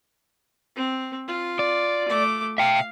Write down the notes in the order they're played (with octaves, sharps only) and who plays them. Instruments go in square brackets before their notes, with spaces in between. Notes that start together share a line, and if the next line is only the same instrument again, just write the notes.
[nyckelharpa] C4
F4
[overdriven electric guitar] D5
[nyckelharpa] A3 D6
[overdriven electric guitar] E5 G5 [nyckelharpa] F5